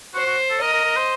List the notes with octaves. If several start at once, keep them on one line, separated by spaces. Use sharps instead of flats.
F#4 C5
F#4
A4
A#4 D#5
A#4
A#4
C5